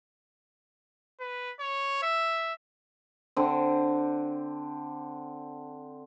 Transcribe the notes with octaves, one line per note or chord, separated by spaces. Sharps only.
B4
C#5
E5
D3 C4